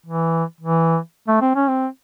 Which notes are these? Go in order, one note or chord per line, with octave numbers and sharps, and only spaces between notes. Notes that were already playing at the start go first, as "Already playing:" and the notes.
E3
E3
A3
C4
C#4
C4